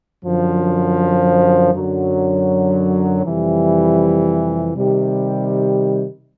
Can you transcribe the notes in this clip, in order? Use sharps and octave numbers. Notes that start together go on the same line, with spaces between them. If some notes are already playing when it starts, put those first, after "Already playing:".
F#2 D3 F3
F#2 D3 F#3
F2 C3 E3 G3
C3 D#3 G3